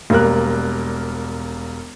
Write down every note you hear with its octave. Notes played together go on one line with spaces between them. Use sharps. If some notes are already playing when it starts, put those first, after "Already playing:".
E1 G3 A#3 A#4 F#6